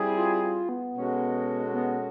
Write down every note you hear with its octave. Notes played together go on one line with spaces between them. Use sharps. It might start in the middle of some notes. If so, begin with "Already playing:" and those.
Already playing: G3 C4 E4 G#4
F4
F4
B3
B2 G#3 C#4 F#4 A4
B3